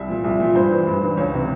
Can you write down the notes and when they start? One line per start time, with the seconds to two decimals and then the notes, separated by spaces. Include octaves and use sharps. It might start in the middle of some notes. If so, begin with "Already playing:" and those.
Already playing: C2 E5
0.08 A#2 F3
0.24 C2
0.40 A#2 F3
0.55 G2 C5
0.71 E3
0.87 G2
1.02 E3
1.17 C#2 C#5
1.34 C3 E3